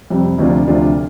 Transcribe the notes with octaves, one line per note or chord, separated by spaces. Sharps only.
F2 C3 G3
D2 C3 F3 D4 F4
D2 C3 F3 D4 F4